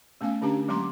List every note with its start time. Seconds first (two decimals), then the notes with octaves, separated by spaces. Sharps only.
0.21 A3 B3 C#4 F5 G#5
0.42 D3 C#4 D4 G4 A#5
0.68 F#3 G#3 A#3 A#5 C6 D6